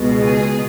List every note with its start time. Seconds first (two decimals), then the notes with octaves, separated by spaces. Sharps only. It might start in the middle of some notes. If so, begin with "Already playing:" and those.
Already playing: C#2 B2 G#3
0.25 G#4